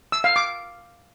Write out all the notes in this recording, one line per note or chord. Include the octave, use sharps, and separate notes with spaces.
E6
F5
D6